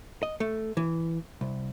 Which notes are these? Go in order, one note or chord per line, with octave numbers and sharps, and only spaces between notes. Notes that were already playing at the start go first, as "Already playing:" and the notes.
D#5
A3
E3
C2